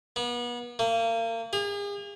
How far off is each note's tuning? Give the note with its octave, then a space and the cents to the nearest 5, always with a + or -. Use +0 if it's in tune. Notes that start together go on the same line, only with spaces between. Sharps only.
B3 -35
A#3 -35
G#4 -40